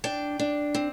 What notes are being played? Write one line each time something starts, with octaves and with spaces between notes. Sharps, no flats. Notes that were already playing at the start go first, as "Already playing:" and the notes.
D4 G5
D4
C4